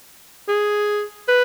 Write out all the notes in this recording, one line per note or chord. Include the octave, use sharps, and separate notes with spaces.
G#4
B4